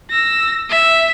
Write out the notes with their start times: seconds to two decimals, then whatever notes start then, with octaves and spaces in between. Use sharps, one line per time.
0.11 E6 A#6
0.70 E5